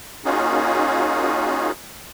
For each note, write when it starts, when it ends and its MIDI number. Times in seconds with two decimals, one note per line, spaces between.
0.25 1.71 58
0.25 1.71 61
0.25 1.71 63
0.25 1.71 65
0.25 1.71 66
0.25 1.71 68